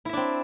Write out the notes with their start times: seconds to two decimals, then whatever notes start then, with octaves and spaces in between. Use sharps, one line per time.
0.05 E4
0.09 E5
0.13 D4
0.17 C4